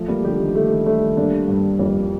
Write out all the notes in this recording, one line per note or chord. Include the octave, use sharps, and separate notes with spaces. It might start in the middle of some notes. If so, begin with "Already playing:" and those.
Already playing: F3 A3
G3 A#3
D3 F3 G4
D#3
D3 A3
D#3
D#3 G3 A3
G3 A#3 D4
G2
F2 G3 A#3